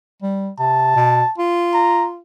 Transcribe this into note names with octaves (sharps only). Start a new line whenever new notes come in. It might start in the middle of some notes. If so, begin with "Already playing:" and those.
G3
C3 A5
B2
F4
A#5